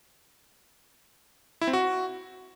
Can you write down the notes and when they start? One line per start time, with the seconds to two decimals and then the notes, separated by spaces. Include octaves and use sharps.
1.61 E4
1.67 C4
1.73 F#4